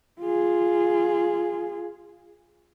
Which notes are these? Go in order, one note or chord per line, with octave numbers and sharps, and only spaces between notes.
F4 G#4